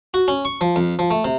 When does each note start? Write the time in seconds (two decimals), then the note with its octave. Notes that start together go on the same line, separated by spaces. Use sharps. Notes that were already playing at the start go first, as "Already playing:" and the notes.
0.14 F#4
0.28 C#4
0.45 C#6
0.61 F3
0.76 F2
0.99 F3
1.11 A3
1.24 C3